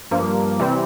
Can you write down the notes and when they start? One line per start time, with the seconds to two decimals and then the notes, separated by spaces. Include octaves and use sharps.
0.11 G2 F3 A#3
0.60 C3 E3 G3 C4